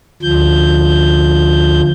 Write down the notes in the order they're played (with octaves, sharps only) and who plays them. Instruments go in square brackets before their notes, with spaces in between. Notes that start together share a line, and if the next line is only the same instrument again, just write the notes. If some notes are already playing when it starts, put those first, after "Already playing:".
[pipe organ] D2 F3 G6